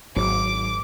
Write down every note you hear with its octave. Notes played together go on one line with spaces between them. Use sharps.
G#1 G#2 F#3 D6